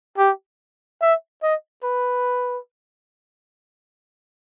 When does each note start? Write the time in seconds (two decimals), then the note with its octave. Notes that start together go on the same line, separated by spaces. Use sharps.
0.18 G4
1.01 E5
1.42 D#5
1.83 B4